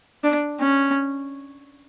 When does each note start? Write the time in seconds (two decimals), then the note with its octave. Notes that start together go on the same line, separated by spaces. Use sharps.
0.24 D4
0.60 C#4